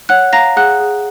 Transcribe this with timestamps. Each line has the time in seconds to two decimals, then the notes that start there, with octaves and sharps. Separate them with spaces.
0.09 C#5 F#5 F#6
0.33 F5 A#5 A#6
0.56 G#4 F#5 F#6
0.80 G#4